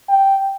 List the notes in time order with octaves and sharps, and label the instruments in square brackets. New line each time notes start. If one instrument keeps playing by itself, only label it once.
[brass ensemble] G5